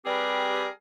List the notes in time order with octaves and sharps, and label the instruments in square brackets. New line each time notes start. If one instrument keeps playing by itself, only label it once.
[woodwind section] G3 C4 G4 G#4 A#4 B4